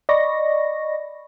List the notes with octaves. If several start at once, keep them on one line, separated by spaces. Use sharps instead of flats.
D5 D#5 B5 C#6 A#6